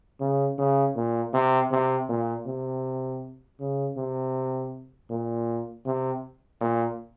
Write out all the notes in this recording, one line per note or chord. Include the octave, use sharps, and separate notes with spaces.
C#3
C#3
A#2
C3
C3
A#2
C3
C#3
C3
A#2
C3
A#2